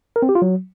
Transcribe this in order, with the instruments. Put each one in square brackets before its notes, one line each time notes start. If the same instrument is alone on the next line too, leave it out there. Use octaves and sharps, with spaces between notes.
[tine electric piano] A#4
C4
G4
F4
F#3